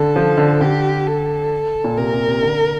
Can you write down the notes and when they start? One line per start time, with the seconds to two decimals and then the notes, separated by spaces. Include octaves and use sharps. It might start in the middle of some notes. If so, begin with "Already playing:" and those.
Already playing: D3 A4
0.16 F3
0.38 D3
0.61 D3 G4
1.07 A4
1.84 A#2
1.97 C3 A#4
2.13 C3
2.27 C3
2.43 D3